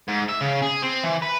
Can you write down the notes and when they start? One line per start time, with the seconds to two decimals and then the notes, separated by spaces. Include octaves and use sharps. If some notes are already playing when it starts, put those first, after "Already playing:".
0.08 G#2
0.28 E5
0.41 C#3
0.62 G#4
0.82 C4
1.03 E3
1.22 B4